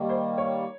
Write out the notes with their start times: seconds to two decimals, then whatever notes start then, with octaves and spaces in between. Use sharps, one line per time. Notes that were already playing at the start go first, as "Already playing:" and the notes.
Already playing: D#3 G3 A#3
0.09 C5
0.38 C#5